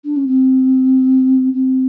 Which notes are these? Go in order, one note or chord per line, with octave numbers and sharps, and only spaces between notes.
D4
C#4
C4
C4